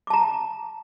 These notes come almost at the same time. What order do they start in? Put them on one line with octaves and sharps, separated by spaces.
D6 A5 A#5